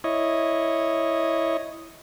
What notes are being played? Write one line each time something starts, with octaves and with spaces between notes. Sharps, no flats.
E4 C#5 D#5